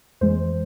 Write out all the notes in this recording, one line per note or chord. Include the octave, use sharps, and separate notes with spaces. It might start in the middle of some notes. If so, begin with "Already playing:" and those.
F2 E3 G#3 C5